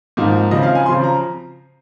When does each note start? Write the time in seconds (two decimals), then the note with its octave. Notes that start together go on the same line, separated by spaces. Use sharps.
0.17 G#2 F3 A#3 D#4
0.51 C#3 F3 C4 D#5
0.63 F5
0.75 G#5
0.86 C#3 F3 C4 C6
1.04 A#5